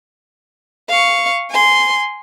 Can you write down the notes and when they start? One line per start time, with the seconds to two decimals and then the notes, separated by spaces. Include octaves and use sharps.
0.89 F5 C#6
1.50 G#5 C6